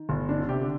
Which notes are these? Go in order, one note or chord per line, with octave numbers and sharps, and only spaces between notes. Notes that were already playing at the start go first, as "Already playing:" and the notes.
Already playing: D#3
G1
D#3 D4
D3
C3 G4
D3